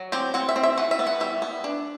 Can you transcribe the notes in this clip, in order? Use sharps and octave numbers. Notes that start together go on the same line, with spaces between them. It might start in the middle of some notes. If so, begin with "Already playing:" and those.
Already playing: F#3
C4 G4
C4 F#5
E5
C4
E5
E3 F#5
E5
B3
F#5
G3 E5
B3
D4